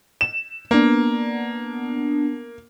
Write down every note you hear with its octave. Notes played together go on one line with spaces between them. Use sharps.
E7
A#3 B3 D4